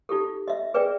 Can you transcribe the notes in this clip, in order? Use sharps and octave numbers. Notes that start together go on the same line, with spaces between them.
D#4 F4 G4 A4
D#5 E5
G#4 B4 D5 E5 G5